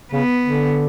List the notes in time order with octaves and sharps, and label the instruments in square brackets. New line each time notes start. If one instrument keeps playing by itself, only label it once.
[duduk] C#3 [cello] B3
[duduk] D3